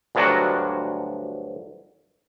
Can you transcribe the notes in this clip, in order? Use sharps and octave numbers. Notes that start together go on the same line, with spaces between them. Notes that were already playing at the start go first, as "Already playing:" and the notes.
D2 G2 F3 F#3 D4 F#4